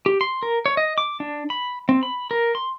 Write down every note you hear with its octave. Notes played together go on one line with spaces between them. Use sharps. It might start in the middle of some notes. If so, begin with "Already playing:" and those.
G4
C6
A#4
C#5
D#5
D6
D4
B5
C4
B5
A#4
C6